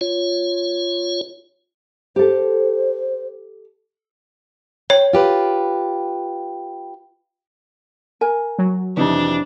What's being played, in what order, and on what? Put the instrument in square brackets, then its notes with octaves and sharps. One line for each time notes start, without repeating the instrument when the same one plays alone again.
[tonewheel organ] F4 C#5
[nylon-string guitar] G4 A4 [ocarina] C5
[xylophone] C#5 [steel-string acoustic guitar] G5
[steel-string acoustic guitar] F4 G4 B4
[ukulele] A#4 G#5
[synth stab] F#3
[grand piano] F2 C3 E3 [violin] D4 [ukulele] D#4